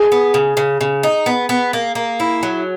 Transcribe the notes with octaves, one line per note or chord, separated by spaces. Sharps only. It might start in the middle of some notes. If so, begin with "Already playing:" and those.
Already playing: G#4
B3
C#3
C#3
C#3
D#4
B3
B3
A#3
A#3
E4
F#3